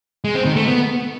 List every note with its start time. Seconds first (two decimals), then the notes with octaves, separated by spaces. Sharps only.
0.24 G#3
0.35 C4
0.45 D#3
0.56 A3
0.67 B3